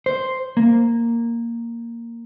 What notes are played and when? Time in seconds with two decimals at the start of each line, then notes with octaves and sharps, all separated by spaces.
0.06 C5
0.57 A#3